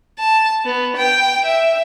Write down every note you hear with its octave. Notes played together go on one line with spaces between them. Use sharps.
A5
B3
G5
E5